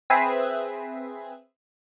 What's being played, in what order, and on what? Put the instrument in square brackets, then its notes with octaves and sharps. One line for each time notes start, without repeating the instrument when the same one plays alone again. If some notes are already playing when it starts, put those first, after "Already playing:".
[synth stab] C4 G#4 B4 E5